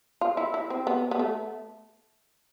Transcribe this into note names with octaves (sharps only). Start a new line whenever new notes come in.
F4
E4
E4
C4
B3
B3
A3